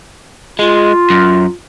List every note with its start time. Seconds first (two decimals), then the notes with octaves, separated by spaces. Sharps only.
0.59 G#3 F4
1.10 F#2